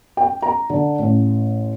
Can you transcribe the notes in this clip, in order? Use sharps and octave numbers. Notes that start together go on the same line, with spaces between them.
G5
A#5
D3
A1